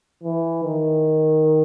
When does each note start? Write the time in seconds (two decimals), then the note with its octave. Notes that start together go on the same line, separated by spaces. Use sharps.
0.24 E3
0.64 D#3